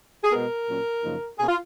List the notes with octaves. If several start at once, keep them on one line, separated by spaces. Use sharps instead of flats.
G#4
B2 G#3 B3 A#4
A#2 F#3 C#4
F#2 C#3 F3 A#3 D#4
B2 A#3 C#4 G#4
F4